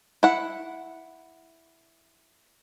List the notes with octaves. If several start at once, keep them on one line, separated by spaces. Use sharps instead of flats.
E4 F#5